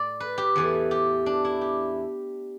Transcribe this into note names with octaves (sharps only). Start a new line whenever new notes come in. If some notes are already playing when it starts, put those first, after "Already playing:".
Already playing: A2 D5
B4
G4
E2 E3 A3
G4
D4
E4
G4